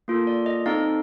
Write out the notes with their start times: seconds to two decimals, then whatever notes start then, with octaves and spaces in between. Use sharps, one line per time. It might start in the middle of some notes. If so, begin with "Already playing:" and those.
0.08 A#3 F4 A4
0.27 D5
0.46 D#5
0.66 C4 D#4 A4 F5